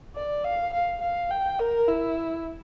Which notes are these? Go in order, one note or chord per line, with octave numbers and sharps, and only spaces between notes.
D5
F5
F5
F5
G5
A#4
E4